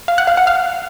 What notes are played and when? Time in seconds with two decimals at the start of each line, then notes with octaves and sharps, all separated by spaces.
0.08 F5
0.18 F#5
0.27 F5
0.37 F#5
0.47 F5